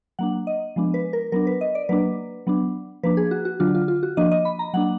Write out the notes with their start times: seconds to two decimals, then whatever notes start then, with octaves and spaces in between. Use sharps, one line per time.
0.19 F#3 A#3 D4 F#5
0.47 D#5
0.76 F3 G#3 B3 D4
0.94 B4
1.13 A#4
1.32 F#3 B3 D4 A#4
1.47 B4
1.61 D#5
1.75 D5
1.89 F#3 A#3 D4 B4
2.47 F#3 B3 D4
3.03 F3 A#3 D4 B4
3.17 G#4
3.31 F#4
3.45 F#4
3.60 D3 F#3 D4 F4
3.75 F4
3.88 F4
4.03 F#4
4.17 F3 A#3 D4 D#5
4.31 D#5
4.45 B5
4.59 A#5
4.73 F#3 A#3 D4 F#5